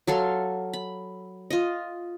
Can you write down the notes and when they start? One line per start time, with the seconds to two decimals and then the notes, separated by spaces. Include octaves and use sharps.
0.07 F#3 A4 F5 C6
0.73 B5
1.50 F4 D#5